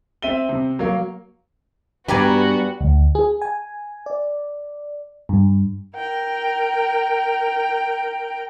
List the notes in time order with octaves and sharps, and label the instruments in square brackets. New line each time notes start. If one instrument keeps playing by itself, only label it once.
[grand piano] C4 E5 D#7 G7
C3
F#3 A#3
[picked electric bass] G2 [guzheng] G3 D5 G#5 [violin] B3 F#4 [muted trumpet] A#5
[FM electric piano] D2
G#4
G#5
D5
G2
[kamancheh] A#4 G5